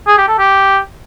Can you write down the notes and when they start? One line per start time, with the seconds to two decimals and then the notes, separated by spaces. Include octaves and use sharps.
0.07 G#4
0.18 G4
0.28 A4
0.38 G4